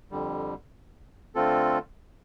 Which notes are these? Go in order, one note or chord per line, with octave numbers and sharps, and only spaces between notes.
F2 D3 G3
D3 A3 C4 F4 A4